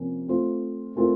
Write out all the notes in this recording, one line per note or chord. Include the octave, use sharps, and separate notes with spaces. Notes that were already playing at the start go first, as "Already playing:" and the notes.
Already playing: C3 F3 A#3 C#4
A3 C4 F4 C5
A3 C4 F4 A#4